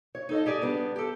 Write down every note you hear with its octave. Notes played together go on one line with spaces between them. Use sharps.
C#5
D#4 A4 D#5
G4 G#4 D5
G3 B3 D4
G4 A4